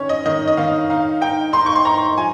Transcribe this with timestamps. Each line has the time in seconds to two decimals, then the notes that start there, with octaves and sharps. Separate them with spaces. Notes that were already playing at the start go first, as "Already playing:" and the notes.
Already playing: D#3 C#4 C#5
0.09 D#5
0.26 D#3 D#5
0.47 D#5
0.57 D#3 F5
0.90 D#4 F5
1.21 D#4 G5
1.53 D#4 C6
1.66 C#6
1.75 C6
1.85 D#4 A#5
2.17 F3 G#5